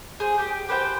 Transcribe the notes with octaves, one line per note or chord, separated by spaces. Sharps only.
G#4 C5
G4 G5
G4 B4 C5 G5